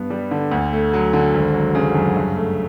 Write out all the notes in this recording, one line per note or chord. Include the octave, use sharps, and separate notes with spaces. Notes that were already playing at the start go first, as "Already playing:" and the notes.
Already playing: G2 B3
G3
D3
D2
A3
F#3
D3
G#1
F#3
C#3
F#2
G2
A3